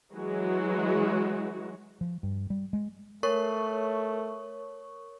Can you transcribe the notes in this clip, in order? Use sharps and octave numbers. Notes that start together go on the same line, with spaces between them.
E3 F#3 G#3 F#4
F3
G2
G3
G#3
A3 A#4 C#5 C#6